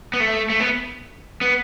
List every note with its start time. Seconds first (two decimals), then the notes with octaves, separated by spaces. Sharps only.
0.13 B3
0.20 A3
0.50 A3
0.60 B3
1.41 B3